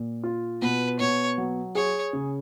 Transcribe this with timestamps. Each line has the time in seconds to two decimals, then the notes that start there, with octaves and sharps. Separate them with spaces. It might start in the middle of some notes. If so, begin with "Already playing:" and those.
Already playing: A#2
0.24 F4
0.62 B2 B4
1.00 B2 C#5
1.38 F#3
1.75 G#4 C#5
2.13 C#3